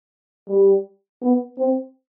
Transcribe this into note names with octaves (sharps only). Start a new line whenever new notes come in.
G3
B3
C4